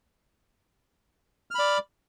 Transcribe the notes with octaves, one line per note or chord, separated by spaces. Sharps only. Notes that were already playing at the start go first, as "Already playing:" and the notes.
D5 B5 F6